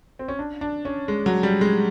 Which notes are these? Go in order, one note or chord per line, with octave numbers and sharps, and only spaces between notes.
C4
C#4
D4
D4
C#4
G#3
F#3
G3
G#3